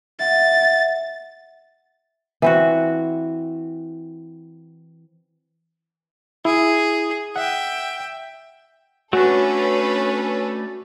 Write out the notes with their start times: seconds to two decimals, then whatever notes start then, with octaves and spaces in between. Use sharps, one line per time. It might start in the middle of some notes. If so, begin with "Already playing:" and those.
0.20 E5 F#5 A6
2.42 E3 C4 F#4
6.45 E4 G#4
7.36 E5 F#5 G5
9.13 A3 C#4 D4 F#4 A4 B4